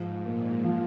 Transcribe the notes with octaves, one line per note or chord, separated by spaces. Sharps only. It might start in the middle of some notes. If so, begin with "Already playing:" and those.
Already playing: G#2 F3
A#2 A#3
F3